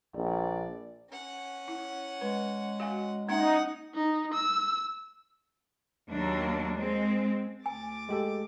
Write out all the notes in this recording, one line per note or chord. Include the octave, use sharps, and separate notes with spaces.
A#1 D5
C#4 F#5
E4
G#3 B4
F#4 F5 G#5
A#3 C#4 D#4 E5 F#5
D#4
E6
D#2 F#3 A#3 D4
G#3 C4
D2 G#5 D6 A6
G#3 G4 A4